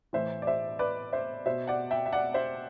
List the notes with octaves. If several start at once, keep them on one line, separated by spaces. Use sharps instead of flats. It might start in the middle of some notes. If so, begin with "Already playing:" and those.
A2 E3 C5 E5
D5
C5 E5
B4 D5
C5 E5
B2 C5 E5
D5 F#5
E5 G5
E5
D5 F#5
C5 E5